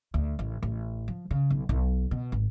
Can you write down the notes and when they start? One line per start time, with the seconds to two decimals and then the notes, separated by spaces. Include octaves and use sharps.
0.14 D2
0.39 A1
0.63 A1
1.08 F3
1.31 C#3
1.50 B1
1.69 B1
2.11 B2
2.32 G#1